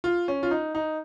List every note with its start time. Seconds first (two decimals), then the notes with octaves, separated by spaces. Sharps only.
0.04 F4
0.28 C#4
0.43 F4
0.51 D#4
0.75 D#4